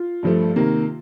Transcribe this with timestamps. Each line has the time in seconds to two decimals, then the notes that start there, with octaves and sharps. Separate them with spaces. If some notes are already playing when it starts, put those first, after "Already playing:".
Already playing: F4
0.23 G2 F3 A3
0.56 C3 D#3 A#3